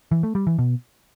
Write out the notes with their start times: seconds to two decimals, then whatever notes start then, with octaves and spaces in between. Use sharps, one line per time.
0.12 E3
0.23 A3
0.35 G3
0.47 E3
0.58 B2